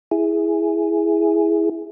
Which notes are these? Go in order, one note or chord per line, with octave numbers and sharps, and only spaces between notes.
E4 G#4